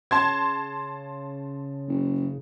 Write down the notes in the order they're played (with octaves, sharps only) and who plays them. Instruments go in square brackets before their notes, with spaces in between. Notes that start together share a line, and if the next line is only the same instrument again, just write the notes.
[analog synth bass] C#3 [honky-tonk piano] A5 C6 G#6
[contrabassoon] F#1